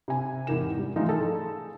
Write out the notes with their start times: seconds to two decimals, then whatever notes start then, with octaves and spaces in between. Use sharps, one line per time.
0.08 C3 G#5
0.47 E2 G#2 C3 G4 A#4 E7
0.79 G3
0.96 E3 F3 A3 D#4 F4
1.09 G#4 A4